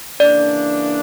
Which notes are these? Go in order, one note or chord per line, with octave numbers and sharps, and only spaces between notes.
C#3 E3 A#3 D4 D5